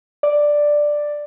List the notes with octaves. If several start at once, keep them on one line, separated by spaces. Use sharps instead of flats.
D5